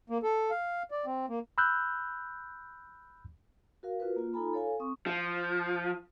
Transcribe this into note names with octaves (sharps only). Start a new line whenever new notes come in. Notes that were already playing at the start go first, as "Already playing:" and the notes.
A#3
A4
F5
D5
C4
A#3
B5 E6 F#6 G6
F#4 A#4 F5
F4 F#4 A#4 B4
A#3 F4
D#4 F4 A4 G#5 A#5 B5
A4 C#5 F5 G#5
C4 C#6 D#6
F3